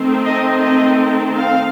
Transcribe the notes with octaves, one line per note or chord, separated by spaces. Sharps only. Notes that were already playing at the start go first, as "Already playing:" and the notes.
Already playing: D#3 A3 C4
D#5
D#5
F5